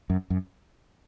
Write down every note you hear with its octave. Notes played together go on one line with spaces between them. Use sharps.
F#2
F#2